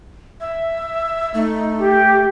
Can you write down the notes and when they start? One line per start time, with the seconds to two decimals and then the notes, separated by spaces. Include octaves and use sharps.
0.40 E5
1.34 A3 D#4
1.78 G4